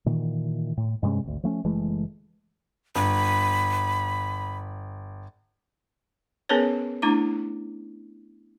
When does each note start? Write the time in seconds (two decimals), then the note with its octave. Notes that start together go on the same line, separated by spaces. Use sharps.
0.06 A#2 D#3 E3
0.77 A2
1.03 G2 C3 G#3 C#4
1.24 G#1 D2
1.43 F3 A3 C#4
1.64 F#1 E3 G#3 A3
2.96 G1 B5
6.49 B3 C#4 G#4 A#4 B4 C#5
7.02 A3 D4 E4 A#5 D6